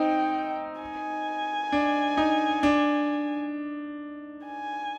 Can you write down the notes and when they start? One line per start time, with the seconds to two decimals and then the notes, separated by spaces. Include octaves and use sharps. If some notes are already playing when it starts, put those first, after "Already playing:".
Already playing: C4 D#4 G5
0.81 G#5
1.72 D4
2.17 D#4
2.63 D4
4.45 G#5